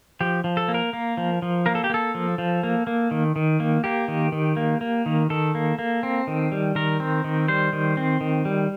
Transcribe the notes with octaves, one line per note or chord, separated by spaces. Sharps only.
F3 G4
F3
A4
A#3
A#4
A#3
F3
F3
A#3 A#4
A4
G4
A#3 A4
F3
F3
A#3
A#3
D#3
D#3
A#3
A#3 G4
D#3
D#3
A#3
A#3
D#3
D#3 A4
A#3
A#3
C4
D#3
G3
D#3 A#4
C4
D#3
G3 C5
D#3
C4
D#3
G3